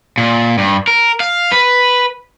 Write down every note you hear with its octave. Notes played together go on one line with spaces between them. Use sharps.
A#2
G2
A#4
F5
B4